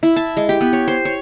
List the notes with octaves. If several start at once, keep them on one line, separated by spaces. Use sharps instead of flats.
E4
A5
G#3
G4
B3
C#5
C5
C#5